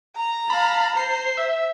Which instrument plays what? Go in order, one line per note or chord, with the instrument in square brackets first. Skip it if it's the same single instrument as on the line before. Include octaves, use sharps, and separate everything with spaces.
[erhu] A#5
[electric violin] F5 A5 [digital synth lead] B5
[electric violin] C5 [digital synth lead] C7
[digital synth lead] E5